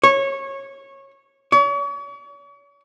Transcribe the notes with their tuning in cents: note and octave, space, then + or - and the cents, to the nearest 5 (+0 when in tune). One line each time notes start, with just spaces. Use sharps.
C#5 -20
C#5 +40